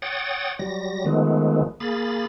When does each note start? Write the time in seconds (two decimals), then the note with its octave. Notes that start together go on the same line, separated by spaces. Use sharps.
0.02 C#5 F#5 G5 D#6 A6
0.59 F#3 G3 A#6
1.06 D#3 F3 G#3 A3 B3
1.80 A#3 G#4 B5 A6